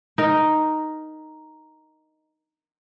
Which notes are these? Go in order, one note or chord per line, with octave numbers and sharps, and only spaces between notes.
D#4 A#4